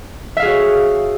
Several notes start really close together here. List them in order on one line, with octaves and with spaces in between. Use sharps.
E5 F5 G#4 F#4 C#5